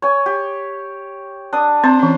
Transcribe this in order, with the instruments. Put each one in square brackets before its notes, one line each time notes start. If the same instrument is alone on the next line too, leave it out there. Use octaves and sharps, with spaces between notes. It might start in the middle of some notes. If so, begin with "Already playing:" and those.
[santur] C#5 G#5
G4
D4 D#6
[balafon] C4 [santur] C5
[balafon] E3 C#4